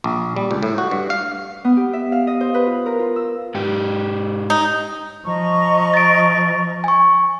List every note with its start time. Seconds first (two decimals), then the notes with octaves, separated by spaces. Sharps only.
0.04 A#1
0.36 G3
0.51 C#2
0.63 A2
0.78 F#4
0.91 G2
1.10 F5
1.64 B3
1.77 G4
1.93 E5
2.12 F5
2.27 D#5
2.41 C5
2.54 B4
2.66 F4
2.86 A#4
2.99 F4
3.16 E6
3.55 G#2 G4
4.50 D#4
5.25 F3 D#5 A#5 C#6
5.94 A6 D7
6.84 G#5 C#6